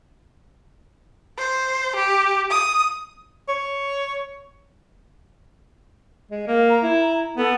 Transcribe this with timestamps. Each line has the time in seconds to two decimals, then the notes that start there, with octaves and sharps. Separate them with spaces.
1.38 C5
1.96 G4
2.51 D#6
3.49 C#5
6.31 G#3
6.48 A#3
6.70 A#5
6.83 E4
7.37 B3 A4